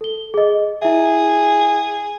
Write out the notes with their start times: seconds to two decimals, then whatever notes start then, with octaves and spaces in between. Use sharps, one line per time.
0.01 A4 G7
0.34 G#4 D#5
0.82 E4 G#4 E5